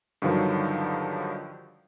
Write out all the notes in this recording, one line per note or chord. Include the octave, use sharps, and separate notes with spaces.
G2 D3 D#3 F3 F#3